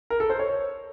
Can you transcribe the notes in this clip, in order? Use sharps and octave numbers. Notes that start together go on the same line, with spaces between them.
A#4
A4
C5
C#5